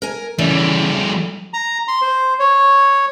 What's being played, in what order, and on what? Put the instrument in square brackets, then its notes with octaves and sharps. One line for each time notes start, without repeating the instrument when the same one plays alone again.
[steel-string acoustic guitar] A#4 G#5
[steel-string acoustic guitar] C#3 E3 [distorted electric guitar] G3 A3
[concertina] A#5
C6
C5
C#5